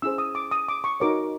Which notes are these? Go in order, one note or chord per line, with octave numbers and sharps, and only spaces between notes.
C#4 E4 G#4 C5 E6
D#6
D6
D#6
D6
C#6
D#4 F#4 A#4 C#5 D6